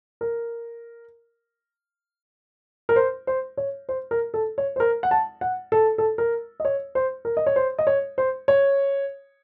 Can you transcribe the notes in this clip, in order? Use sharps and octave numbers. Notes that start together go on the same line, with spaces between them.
A#4
A#4
C5
C5
C#5
C5
A#4
A4
C#5
C5
A#4
F#5
A5
F#5
A4
A4
A#4
D#5
C#5
C5
A#4
D#5
C#5
C5
D#5
C#5
C5
C#5